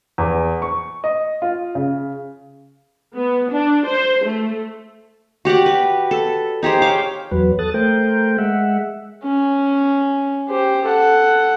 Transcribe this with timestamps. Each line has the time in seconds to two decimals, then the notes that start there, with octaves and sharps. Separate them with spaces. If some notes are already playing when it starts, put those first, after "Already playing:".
0.18 E2
0.62 C#6
1.04 D#5
1.42 F4
1.75 C#3
3.15 B3
3.49 D4
3.87 C5
4.24 A3
5.45 F#4 G4 D5 F#5
5.66 B4
6.11 A4
6.63 D#4 G4 G#4 C5
6.82 C#5 F5 G5 D6
7.31 E2 F#3 B4
7.59 A4 D#6 F#6 A6
7.74 A3 A#4 C5 G5
8.38 G#3 E5 F#5
9.23 C#4
10.48 G4 C5
10.85 A4 F#5